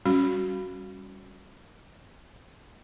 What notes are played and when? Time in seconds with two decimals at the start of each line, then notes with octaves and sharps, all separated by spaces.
0.05 G3 C#4 F#4